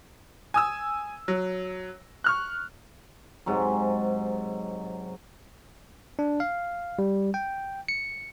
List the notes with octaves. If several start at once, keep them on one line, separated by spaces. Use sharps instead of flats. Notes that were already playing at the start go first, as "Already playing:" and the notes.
G#5 D#6 E6
F#3
C#6 F6 F#6
G#2 C3 F#3
D4
F5
G3
G5
C#7